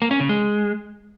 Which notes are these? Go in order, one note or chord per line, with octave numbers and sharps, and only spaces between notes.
A#3
C#4
C#3
G#3